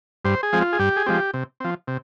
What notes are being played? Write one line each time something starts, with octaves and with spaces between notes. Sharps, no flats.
G2 C5
G#4
F3 G#3 C4
F4
G#4
G2 G4
G#4
F3 G#3 C4 G4
C3
F3 C4
C3